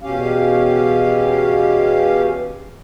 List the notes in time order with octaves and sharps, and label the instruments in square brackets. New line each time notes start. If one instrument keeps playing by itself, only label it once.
[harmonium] E2 B2 C#4 G4 F5